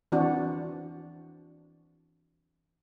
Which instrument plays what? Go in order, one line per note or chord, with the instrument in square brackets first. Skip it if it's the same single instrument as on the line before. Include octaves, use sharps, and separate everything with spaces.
[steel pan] E3 C4 D4 F#4